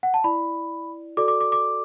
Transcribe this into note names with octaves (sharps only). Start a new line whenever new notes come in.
F#5
A5
E4 D5 B5
F#4 A4 D5 D6
D6
D6
D6